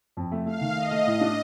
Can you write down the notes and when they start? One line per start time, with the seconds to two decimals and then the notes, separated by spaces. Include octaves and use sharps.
0.17 F2
0.32 A3
0.46 A3 F5
0.61 D#3
0.76 A3 D#5
0.91 A3
1.07 A2
1.21 D4